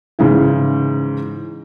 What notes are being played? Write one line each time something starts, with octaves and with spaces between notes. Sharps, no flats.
G#2 C#3 E3